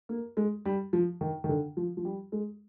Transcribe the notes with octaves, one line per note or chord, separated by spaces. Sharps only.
A#3
G#3
G3
F3
D#3
D#3
D3
F3
F3
G3
G#3